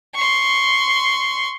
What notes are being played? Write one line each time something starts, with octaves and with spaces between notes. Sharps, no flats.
C6 C#6